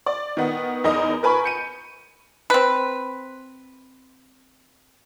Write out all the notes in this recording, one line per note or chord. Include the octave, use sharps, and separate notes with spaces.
D5
D#3 B3
E2 D#4 A#4 D#5
A#4 B4 G#5 B5 C#6
G6 C#7 D#7
C4 B4